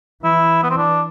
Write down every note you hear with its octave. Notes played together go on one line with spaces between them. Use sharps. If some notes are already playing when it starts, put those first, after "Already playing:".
E3 E4
B3
C4
D4